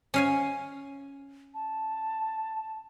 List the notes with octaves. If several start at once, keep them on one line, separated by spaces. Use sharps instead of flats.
C#4 F5 G#5
A5